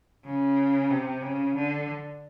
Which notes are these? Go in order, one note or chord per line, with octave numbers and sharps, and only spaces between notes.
C#3
C3
C#3
D3